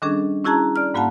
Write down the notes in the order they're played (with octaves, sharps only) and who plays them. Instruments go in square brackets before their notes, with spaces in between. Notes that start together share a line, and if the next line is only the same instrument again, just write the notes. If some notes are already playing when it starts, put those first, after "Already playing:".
[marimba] D#3 G3 C#4 D4 G#4 A4
C#4 E4 F#4 G#4 A5 A#5
D5 F6
G#2 A#3 F#4 F5 F#5 A5